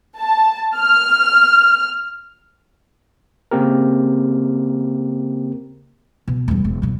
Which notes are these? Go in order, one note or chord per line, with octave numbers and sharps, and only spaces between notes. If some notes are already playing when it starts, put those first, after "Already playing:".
A5
F6
C#3 A#3 C4 G4 A#4
B2
E1 G3
E1
B2 F#3